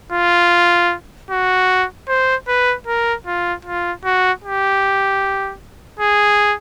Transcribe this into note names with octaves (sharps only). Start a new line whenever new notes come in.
F4
F#4
C5
B4
A#4
F4
F4
F#4
G4
G#4